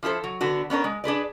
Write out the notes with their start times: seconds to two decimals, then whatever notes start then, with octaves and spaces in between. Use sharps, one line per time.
0.03 F3 E4 G#4 A4 C5
0.24 F#3
0.41 D3 B3 D4 F#4
0.70 B3 C#4 D4 A#4
0.84 G#3
1.04 D4 G#4 B4 D5